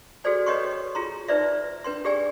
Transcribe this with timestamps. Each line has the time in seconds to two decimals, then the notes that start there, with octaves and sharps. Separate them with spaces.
0.24 F#4 G#4 A4 C5 D5 G#5
0.46 B4 C#5 D#5 G5 C6 C#6
0.95 F4 G#4 A#5 C6
1.28 D#4 B4 C5 D5 E5
1.84 D4 B4 G5 C6
2.05 G4 G#4 D5 G5 G#5